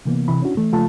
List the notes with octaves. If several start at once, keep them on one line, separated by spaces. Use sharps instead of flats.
C3 E3 A#3 B3
C3 E3 B5
C#4 D4 E4 F#4
E3 A3
C#3 F3 A3 A#3 F4 A5